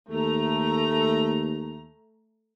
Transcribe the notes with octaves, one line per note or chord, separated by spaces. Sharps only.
D#2 A3 A#5